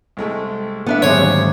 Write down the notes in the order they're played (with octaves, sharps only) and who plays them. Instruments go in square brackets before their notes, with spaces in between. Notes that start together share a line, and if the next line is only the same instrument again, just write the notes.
[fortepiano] C2 G#3 A3
[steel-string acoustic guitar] B3 D4 E5
[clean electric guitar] D#2 G#2 D3 [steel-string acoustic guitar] F#3 [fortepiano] G3 C4 G#4 [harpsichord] C#5